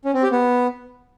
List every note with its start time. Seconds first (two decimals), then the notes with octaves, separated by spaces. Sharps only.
0.05 C#4
0.14 C4
0.23 G4
0.32 B3